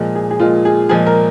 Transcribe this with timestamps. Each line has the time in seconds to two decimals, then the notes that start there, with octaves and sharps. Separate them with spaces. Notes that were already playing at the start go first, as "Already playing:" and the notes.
Already playing: A#2 F3 G#3
0.15 G#4
0.31 G#4
0.40 A#2 F3 G#3 F4
0.65 G#4
0.89 A#2 F3 G#3 G#4
1.07 A#4